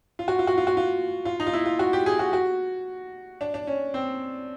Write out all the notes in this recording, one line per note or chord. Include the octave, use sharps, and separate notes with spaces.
F4
F#4
F4
F#4
F4
F#4
F4
F4
D#4
F4
E4
F4
F#4
G4
G#4
F#4
F#4
D4
D4
C#4
C4